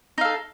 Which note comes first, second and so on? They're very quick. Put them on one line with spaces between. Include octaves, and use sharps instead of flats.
D#4 F5 A4